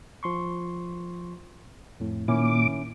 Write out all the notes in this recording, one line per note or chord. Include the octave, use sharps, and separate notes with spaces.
F3 C6 C#6
F2 A2
A#2 D#3 C#4 E4 D6